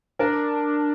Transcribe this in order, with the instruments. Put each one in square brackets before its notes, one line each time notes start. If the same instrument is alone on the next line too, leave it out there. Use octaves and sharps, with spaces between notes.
[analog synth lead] D4 [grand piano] A#4